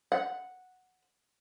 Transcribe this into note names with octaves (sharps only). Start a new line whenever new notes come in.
F#5